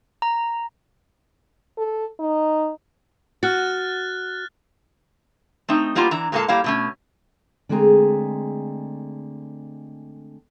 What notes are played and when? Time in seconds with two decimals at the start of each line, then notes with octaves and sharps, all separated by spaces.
0.22 A#5
1.77 A4
2.20 D#4
3.43 F#4 F6 F#6 A6
5.69 A3 C4 D#4
5.95 G3 A#3 B3 E4 F4
6.11 E3 D4 A#5
6.32 A#2 G#3 A#3 A4 F5 A5
6.48 G3 A#3 E4 F5
6.64 B2 A3 C#4
7.69 D3 G#3 A3 C4 G#4 A#5